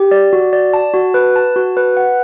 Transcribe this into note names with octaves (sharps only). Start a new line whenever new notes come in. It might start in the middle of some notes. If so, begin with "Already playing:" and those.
Already playing: G4
D5
F#4
D5
A5
F#4
B4
A5
F#4
B4
F#5